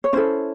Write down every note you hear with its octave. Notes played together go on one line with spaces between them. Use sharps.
C#5
C#4 E4 A4 C5